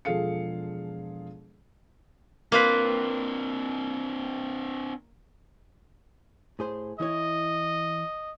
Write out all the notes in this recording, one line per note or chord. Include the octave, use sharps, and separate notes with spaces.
E1 F3 G#4 A4 F5 C#7
A#3 C4 D4 F4 B4
A2 G#4 C5
E3 E4 C#5 D#5